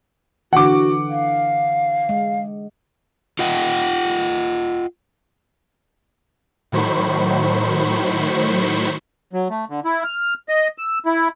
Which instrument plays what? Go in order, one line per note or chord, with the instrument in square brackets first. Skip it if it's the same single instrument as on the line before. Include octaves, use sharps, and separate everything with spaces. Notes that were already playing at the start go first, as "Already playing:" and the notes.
[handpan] D3 E3 [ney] F#4 [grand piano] F#5 D6
[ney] F5
[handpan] G#3
[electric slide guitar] F4 D#5 F#5 G5
[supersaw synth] A2 D#3 F#3 C5 B5 C#6
[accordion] F#3
A3
D3
E4
F6
D#5
E6
E4